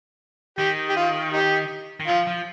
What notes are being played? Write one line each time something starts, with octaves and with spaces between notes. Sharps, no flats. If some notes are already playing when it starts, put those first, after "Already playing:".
D#3 G4
G4
F4
D#4 G4
D#3
F3 F4
F3